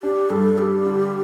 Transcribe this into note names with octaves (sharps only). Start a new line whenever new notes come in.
D4 G4
G2 A4
G3 G4
D3